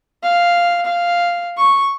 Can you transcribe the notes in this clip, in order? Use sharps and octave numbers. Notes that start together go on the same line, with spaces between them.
F5
F5
C#6